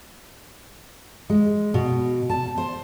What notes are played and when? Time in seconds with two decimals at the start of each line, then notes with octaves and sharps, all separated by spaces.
1.30 G#3
1.74 B2
2.30 A5
2.58 C5